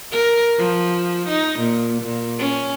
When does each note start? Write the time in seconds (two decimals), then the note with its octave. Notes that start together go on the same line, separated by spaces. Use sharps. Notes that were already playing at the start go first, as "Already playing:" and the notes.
0.12 A#4
0.58 F3
1.28 D#4
1.60 A#2
2.02 A#2
2.38 C#4